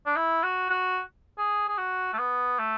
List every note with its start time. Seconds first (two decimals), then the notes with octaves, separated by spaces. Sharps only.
0.06 D4
0.16 E4
0.43 F#4
0.70 F#4
1.38 G#4
1.68 G#4
1.78 F#4
2.13 A3
2.19 B3
2.59 A3